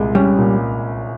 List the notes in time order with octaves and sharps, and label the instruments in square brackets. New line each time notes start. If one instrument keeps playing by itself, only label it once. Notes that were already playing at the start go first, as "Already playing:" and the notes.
Already playing: [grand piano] C2 A#2 G#3
[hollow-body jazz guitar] G3 [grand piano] C#4
[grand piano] A#2